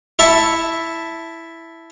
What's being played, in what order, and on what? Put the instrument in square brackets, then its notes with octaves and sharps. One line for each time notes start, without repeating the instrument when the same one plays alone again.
[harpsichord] E4 E5 A5 C#6